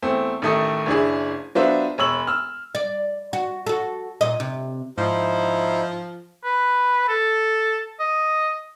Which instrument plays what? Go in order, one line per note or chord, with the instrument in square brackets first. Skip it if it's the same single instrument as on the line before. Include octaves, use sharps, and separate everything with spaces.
[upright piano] E2 A3 C4
A1 D#3 A3 A4 D#6
F#1 D4 E4 G#4
F#3 B3 D4 F4 C5 E5
E1 C#5 E6 F#7
E6 F6
[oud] D5
F#4
F#4 A4
A#2 D#5
C3
[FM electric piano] G#2 [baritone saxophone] F3 [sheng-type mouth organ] D#4 E4 C5
[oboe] B4
A4
D#5